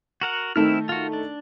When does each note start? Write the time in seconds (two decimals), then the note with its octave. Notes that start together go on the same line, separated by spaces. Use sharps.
0.21 F#4 A#4 F#5
0.56 D#3 A3 C4 D#4 E4 F6
0.89 F4 F#4
1.13 D4